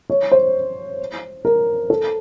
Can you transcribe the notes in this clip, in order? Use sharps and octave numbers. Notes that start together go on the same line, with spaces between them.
C#5
C5
A#4
A4